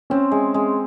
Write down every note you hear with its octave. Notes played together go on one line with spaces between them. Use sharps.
C4 C#4
G#3
G#3